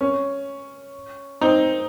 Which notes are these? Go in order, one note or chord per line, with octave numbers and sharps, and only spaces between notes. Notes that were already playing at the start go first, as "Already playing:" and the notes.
C#4
C4 D#4